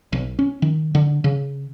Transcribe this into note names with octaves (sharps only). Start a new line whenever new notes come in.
B1
C#4
D#3
D3
C#3